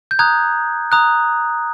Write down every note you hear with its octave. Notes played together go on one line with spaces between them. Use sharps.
G6
A#5 D#6 F#6 G#6
A#5 D#6 F#6